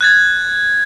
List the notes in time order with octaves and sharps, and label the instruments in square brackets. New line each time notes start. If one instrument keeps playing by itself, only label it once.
[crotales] F#6 G#6 A6